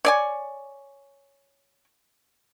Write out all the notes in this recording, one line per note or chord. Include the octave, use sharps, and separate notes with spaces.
C#5 D5 G#5